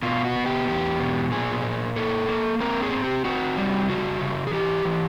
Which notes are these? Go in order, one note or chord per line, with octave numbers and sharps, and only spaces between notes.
B2 F4
F#4
B3
G4
E2 G4
B2
A#2 G#4
A#2
A#3 A4
A#3
C4 A#4
G#4
C4
G4
C4 F#4
G3
C#3 F#4
C#3
G#4
E3 G4
E3